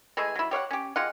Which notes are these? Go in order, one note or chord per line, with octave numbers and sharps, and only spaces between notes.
E3 G#3 A3 G#4
F#3 E4
G4 C#5 F5 F#5
C#4 G4
G#3 F4 G4 F#5